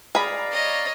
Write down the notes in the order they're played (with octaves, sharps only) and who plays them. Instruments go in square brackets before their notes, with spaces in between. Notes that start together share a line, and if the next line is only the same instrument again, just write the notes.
[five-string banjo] G#4 B5 [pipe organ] D5 F5 A#5
[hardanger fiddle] C#5 D#5